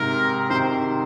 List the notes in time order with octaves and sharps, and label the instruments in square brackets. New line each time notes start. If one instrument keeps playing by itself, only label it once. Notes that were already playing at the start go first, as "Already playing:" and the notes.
Already playing: [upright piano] G#2 C3 [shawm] A#4
[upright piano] C3 D#3 [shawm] C5